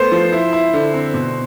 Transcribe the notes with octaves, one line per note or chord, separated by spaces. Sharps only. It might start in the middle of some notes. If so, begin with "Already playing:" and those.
Already playing: A3 B3 C5
F3
E4
E4
D3
C4
B2